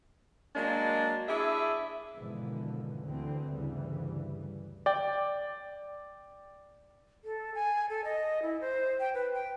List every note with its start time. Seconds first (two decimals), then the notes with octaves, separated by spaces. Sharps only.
0.56 F#3 G#3 A#3 D4
1.28 D4 E4 G#4 E5
2.15 G#1 G#2 B2 D3 E3 F3
3.04 D2 D3 E3 C4
3.52 D2 G2 C#3 E3 G3
4.86 D5 G5
7.24 A4
7.55 G#5
7.89 A4
8.05 D#5
8.42 E4
8.61 C5
9.00 G5
9.14 B4
9.34 G5